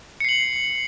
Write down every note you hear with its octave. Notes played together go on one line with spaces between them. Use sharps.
C7 C#7 F#7